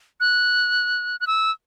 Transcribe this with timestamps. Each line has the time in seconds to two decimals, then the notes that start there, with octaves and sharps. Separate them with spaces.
0.20 F#6
1.20 F#6
1.27 E6